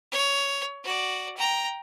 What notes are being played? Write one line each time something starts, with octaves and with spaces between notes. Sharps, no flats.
C#5
F#4 D5
G5 A#5